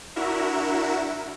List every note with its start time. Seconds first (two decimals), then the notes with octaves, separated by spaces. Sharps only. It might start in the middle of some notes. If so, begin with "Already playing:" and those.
0.16 D4 E4 F#4 A#4 E5